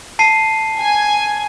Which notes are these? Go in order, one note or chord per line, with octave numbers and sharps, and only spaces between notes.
A5 C7 D#7
G#5